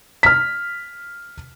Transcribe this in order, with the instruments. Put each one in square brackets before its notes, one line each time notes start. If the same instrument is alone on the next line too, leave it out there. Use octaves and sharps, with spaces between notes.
[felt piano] F6 B6